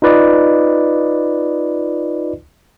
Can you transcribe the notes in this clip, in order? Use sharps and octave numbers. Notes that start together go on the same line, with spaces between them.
D#4 F4 B4 D5 D#5